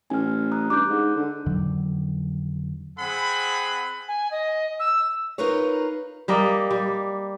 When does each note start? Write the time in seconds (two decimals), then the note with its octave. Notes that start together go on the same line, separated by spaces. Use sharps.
0.10 A1 G#5 F6
0.52 A#5 D#6 F#6
0.70 G2 D6 F#6 G6
0.89 G#2
1.16 D3
1.46 F2 D3 D#3 F#3
2.99 C4 G#4 F#5 B5
4.08 G#5
4.31 D#5
4.79 E6
5.38 D#4 F4 A#4 B4 C#5
6.28 G3 A#3 D#5
6.70 G3